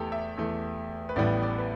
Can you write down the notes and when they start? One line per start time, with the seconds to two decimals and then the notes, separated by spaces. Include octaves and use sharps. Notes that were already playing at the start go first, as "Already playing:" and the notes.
Already playing: E2 E3 A3 G4 A4
0.12 E5
0.37 E2 E3 A3
1.09 B4
1.16 A1 A2 E3 G3 B3 D5
1.43 D5
1.58 B4